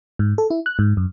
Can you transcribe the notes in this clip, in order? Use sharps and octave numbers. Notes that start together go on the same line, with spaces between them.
G#2
A4
E4
F#6
G#2
F#2